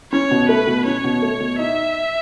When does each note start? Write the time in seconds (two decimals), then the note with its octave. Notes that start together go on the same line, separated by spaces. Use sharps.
0.12 C#4 C#5
0.31 B2
0.49 A3 B4
0.67 B2
0.86 C#4 C#5
1.04 B2
1.22 A3
1.40 B2
1.59 D#4 E5